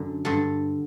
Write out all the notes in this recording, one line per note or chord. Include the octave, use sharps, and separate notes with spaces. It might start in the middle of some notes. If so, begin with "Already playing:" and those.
Already playing: F#2 D3
G2 D3 A4